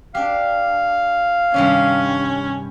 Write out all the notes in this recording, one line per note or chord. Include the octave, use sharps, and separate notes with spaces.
D4 G4 F5
G2 C3 D#3 C#4